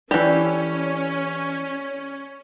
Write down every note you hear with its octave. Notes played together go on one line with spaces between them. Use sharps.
E3 C#4 G4 A4 D5